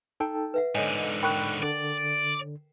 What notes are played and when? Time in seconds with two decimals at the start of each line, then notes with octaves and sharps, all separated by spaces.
0.20 D#4 A4 G5
0.54 B4 E5 F#5
0.75 G#2 D3 A4 C#5 D#5 G#5
1.23 A#4 G5 B5 C#6 F#6
1.63 D3 D5